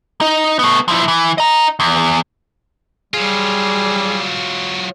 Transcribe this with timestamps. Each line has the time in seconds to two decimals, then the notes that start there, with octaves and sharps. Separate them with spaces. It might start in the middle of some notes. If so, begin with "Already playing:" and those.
0.21 D#4
0.59 A3 B3
0.88 F3 E4
1.08 E3
1.38 D#5 A#5
1.80 E2
3.14 F#3 G3 F4 G#4